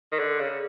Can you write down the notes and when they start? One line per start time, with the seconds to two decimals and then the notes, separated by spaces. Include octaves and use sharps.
0.12 D#3
0.19 D3
0.40 C#3